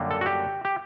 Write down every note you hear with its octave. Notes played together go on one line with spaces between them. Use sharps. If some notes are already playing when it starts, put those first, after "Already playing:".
Already playing: F#2 D3 G3 A#3
A4
F#4
G4
G4